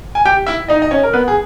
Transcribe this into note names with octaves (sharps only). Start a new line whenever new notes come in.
G#5
G4 G5
E4 E5
D#4 D#5
D#5
C#4 C#5
A#4
B3 B4
G#4